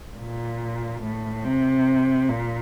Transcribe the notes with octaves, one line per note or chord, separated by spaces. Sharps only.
A#2
A2
C3
A#2